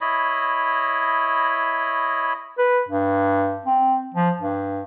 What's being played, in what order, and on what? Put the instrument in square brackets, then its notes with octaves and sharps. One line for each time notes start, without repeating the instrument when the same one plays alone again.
[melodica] E4 C#5 D#5 B5
[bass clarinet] B4
G2
C4
F3
G2